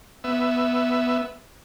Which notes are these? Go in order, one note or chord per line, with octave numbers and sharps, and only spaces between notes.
B3 E5